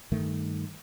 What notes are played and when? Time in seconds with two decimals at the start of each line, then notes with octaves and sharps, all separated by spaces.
0.12 G2 D#3 A3